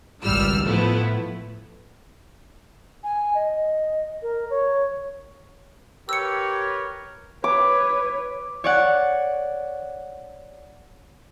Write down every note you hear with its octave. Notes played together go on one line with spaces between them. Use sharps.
G#1 C#2 G3 E6 F6
A2 F3 A3 B3 E4
G#5
D#5
A#4
C#5
G4 A#4 B4 C#5 E6 C#7
B4 C#5 D6
C#5 D5 F#5